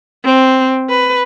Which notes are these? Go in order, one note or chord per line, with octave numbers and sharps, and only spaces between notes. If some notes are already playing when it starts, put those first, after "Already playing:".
C4
B4